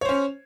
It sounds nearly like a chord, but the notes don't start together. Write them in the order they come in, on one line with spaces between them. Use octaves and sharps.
C#5 C5 C#4